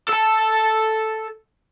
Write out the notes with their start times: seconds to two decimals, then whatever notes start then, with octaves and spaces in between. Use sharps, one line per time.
0.09 A4 A5